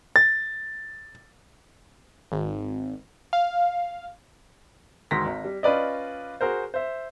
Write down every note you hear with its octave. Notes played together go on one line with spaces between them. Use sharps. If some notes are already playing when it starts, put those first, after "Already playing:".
A6
G#1
F5
D2 G#2 D#3 C6 A#6 B6
G#1
G3
C#4 F4 B4 D5 D#5
F#4 G#4 A#4 C5
C5 E5